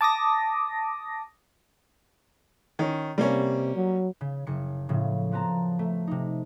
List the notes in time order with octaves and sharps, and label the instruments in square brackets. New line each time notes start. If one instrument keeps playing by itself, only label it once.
[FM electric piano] A5 D6 D#6 A#6
[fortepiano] D#3 C#4
[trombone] C3 [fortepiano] G3 A#3 C#4
[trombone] F#3
[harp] C#3
F#1 C#3 C#7
A2 C#3 F3
F3 B3 C4 A5 A#5
A3
C3 D#4